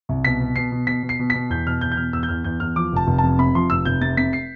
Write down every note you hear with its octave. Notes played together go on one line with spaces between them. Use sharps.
C2
B2 B6
B2
B2 C7
B2
B2 B6
B2
C7
B2
B2 B6
E2 G6
B2 F6
E2 G6
G6
B2 F6
E2 E6
G6
E2 F6
E2 G6
E2 F6
F3 D6
F1 A5
F1
F2 A5
C3 B5
F3 C6
F1 E6
F1 G6
C3 A6
C3 B6
C7